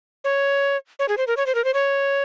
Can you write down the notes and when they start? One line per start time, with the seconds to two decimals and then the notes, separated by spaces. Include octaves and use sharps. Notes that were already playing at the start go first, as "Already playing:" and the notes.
0.24 C#5
0.99 C#5
1.09 G#4
1.18 C5
1.27 A#4
1.37 C#5
1.46 C5
1.55 A#4
1.64 C5
1.74 C#5